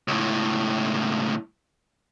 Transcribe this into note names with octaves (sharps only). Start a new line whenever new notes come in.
C#2 A2